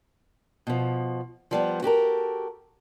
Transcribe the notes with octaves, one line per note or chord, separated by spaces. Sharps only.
B2 F3
F3 G3 B3
F#4 G4 A4 A#4